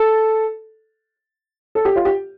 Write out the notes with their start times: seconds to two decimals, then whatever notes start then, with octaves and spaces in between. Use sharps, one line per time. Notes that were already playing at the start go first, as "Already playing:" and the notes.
Already playing: A4
1.75 A4
1.85 G4
1.96 F4
2.05 G4